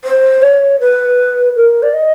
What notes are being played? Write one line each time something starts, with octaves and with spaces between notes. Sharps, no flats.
C5
C#5
B4
A#4
D5
D#5